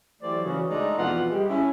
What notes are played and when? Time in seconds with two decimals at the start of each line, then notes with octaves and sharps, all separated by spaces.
0.21 E3 F#3 A3 G4 C5 D5
0.44 C#3 E3 F#4
0.69 G#3 A3 D4 D#4 D5
0.98 F2 B2 E3 F4 F#5
1.30 G3 G#3 G4
1.49 C#4 E4